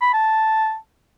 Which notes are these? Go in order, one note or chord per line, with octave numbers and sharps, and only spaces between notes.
B5
A5